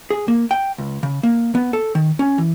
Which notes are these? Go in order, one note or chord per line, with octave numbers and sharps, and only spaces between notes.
G#4
A#3
G5
C#2
C#3
A#3
B3
A4
D#3
C#4
E3